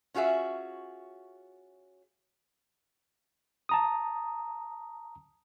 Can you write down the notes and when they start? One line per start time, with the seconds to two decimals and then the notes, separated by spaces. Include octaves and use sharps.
0.14 C#4 F4 F#4 G#4 E5
3.69 A5 A#5 D#6